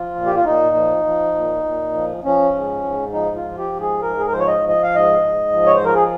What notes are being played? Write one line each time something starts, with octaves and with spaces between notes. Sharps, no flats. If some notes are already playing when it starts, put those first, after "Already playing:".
Already playing: F3 F4
A#2
G4
F4
A#2 D#4
F3
F3
A#2
A#2
F3
F3 C#4
G#2
G#2
F3 D#4
F4
F3
G4
G#2
G#4
G#2 A#4
G#4
A#4
F3 C5
C#5
D#5
F3
D#5
F5
G#2 D#5
G#2
F3
C#5
C5
F3 A#4
G#4